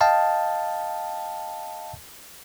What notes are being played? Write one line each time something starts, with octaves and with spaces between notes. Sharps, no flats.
D#5 F5 G5 A5